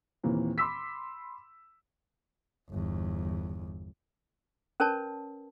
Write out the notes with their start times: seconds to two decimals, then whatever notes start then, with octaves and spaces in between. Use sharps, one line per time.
0.23 D#2 A#2 E3 A#3 C4
0.58 B5 C6 D6 E6 B6
2.70 G1 E2
4.80 C#4 A#4 B4 C#5 A5